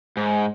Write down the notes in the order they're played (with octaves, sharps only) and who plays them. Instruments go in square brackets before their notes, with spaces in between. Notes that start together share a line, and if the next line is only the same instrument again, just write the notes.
[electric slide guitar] G#2